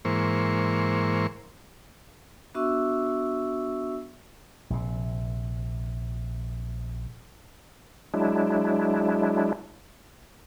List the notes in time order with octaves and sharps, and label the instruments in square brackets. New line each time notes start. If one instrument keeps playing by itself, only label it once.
[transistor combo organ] G#2 E3 A#3 C5 C#6
[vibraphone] B3 D4 F#4 E5 C#6 E6
[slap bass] A#1 C3
[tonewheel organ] F#3 G#3 D4 E4